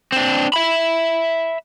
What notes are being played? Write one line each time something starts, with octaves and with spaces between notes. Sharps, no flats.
C4 D4
E5 B5